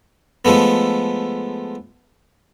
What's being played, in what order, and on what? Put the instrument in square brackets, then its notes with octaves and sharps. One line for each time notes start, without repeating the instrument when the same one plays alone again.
[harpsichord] F3 G#3 A3 B3